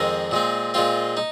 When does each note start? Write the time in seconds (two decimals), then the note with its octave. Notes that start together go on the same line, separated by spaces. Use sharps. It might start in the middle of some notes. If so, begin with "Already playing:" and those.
Already playing: F2 D#3 G#3 C4 A#4
0.31 A#2 G#3 C4
0.74 A#2 G#3 C4 F4
1.17 D#4